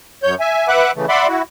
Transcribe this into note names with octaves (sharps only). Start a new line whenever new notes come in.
F#2 C#5 G6
E5 G#5
B4 E5 F#5 D6 F#6
C#3 E3 A3
D5 E5 F#5 B5 C6 D6
E4 F#4